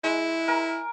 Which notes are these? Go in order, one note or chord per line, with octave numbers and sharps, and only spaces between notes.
G#3 E4
A#4 G#5